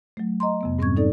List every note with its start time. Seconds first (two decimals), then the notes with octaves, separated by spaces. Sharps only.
0.17 F#3 A3
0.40 D#5 A#5 C6
0.61 F2 C3 B3
0.79 G#2 G3 C4 C#4 C#6 G#6
0.97 D#4 A4 D5